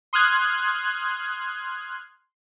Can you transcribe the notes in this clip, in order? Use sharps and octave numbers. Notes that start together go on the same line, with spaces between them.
C6 D#6 F6 F#6 G#6